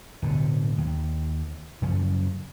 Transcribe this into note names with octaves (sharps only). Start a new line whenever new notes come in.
D1 B2 D3
D#2
F#2 C#3 F3 C#4